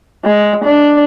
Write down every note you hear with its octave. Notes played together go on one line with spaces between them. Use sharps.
G#3
D4